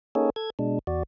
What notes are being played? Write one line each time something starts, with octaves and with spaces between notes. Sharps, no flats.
A#3 C#4 D#4 G#4 A4 C#5
A4 G#6
B2 G#3 D4
E2 F#4 D5